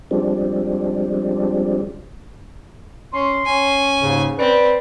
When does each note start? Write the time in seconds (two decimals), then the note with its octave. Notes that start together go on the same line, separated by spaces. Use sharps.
0.11 F3 G3 G#3 C4 D4
3.14 C#4 C6
3.45 C#4 G#5
4.01 D#2 G#2 C#3
4.39 C4 B4 D5